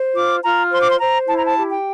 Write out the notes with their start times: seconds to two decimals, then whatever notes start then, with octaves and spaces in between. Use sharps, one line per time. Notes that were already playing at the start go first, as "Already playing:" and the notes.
Already playing: C5
0.15 F4 D6
0.44 F4 A#5
0.71 C5 C6
0.81 D6
0.90 C6
0.99 C5 A#5
1.27 E4 A5
1.36 A#5
1.45 A5
1.56 G4
1.70 G5